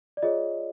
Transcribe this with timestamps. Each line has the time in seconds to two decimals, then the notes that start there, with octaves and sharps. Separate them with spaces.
0.17 D5
0.23 F4 G#4 C#5 D#5